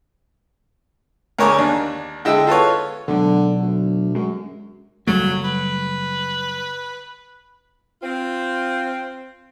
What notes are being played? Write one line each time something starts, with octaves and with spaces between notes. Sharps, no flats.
D2 A#4 C#5 G#5 D6
D#2 D4
D3 G#3 E4 D#5 G5 E6
F4 A4 B4 C#5
B2 D3 F#3 G#3
D2
F#2 G#3
F#1 F#3 G3 A3
B4
C4 F4